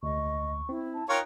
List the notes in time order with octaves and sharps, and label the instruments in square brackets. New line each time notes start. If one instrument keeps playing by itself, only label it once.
[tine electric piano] D2 [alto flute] D#5 [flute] C#6
[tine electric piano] C4 [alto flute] E4
[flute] A5
[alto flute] D#4 [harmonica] F4 A#4 C#5 [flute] G5 [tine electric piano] C#6 F#6